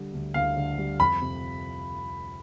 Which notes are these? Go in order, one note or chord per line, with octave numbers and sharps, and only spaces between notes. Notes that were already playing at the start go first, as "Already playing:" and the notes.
Already playing: D3 G3
D2
D2 F5
D3
G3
F2 B5
C3